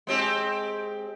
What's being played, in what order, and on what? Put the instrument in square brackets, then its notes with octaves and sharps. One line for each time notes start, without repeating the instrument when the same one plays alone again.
[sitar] G#3 C4 G4